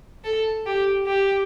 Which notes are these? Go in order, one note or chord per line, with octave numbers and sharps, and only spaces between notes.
A4
G4
G4